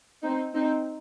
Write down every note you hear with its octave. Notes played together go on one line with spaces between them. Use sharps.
C4 D#4
C4 D#4